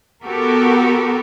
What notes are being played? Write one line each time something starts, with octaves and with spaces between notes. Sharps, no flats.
B3 F#4 G4 A4 A#4